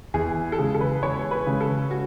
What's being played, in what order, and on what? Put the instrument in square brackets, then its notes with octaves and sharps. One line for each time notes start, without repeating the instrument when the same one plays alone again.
[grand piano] E2 [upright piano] G#4
[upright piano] A4
[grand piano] C#3 G#3 [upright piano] G#4
[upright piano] A4
B4
[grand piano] E2 [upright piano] C#5
[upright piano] B4
[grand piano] C#3 G#3
[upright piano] A4
F#4